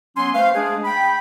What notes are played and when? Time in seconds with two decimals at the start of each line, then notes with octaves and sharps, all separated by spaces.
0.17 F#3 B3 C#4 G#5 C6
0.35 A3 B4 C5 F5
0.54 G#3 A3 D4 G#4
0.85 G5 B5